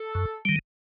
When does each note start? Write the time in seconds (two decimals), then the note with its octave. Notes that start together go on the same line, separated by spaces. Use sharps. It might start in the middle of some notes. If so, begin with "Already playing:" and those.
Already playing: A4
0.15 F#2
0.45 D#3 G3